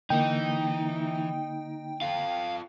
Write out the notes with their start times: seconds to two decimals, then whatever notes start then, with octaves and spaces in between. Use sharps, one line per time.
0.10 D3 E3 A#3 D#4 G5
2.02 F4 A4 F5